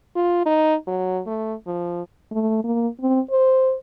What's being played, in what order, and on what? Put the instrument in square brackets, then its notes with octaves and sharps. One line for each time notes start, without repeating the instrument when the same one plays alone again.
[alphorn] F4
D#4
F#3
A3
F3
[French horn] A3
A#3
C4
C5